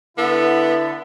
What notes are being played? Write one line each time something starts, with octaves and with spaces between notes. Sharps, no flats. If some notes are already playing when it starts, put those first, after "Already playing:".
D3 B3 E4 A4